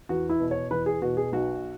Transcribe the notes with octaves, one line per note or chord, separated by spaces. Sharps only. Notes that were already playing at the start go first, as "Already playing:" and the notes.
E2 F#4
E4
B2
C#5
E2 B4
G#4
B2 F#4
G#4
B1 F#4